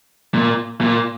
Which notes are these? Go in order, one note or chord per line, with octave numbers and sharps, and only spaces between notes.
A#2
A#2